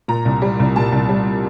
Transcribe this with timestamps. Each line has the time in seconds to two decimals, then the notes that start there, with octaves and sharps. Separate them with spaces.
0.08 A#2 A#5
0.25 C2
0.42 G3
0.60 C2
0.76 A#2 A5
0.92 C2
1.09 G3